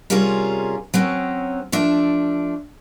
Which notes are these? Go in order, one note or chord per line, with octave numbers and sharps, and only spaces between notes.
C3 G3 C#4 F4 G#4 A#4
F#3 C4 C#4
F3 A3 D4 E5